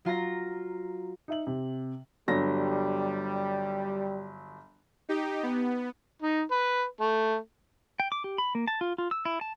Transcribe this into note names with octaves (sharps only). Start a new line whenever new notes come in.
F#3 F4 A#5 A#6
D#4 E5 F#7
C3
G1 F#3 G3 A#6
D#4 G4
B3
D#4
B4
A3
G5
D6
G4
B5
A#3
A5
F4
F4
E6
E4
A5